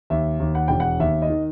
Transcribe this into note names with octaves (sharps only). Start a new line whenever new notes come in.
D#2 E5
D#2
F#5
E1 G5
F#5
D#2 E5
D#5
D#3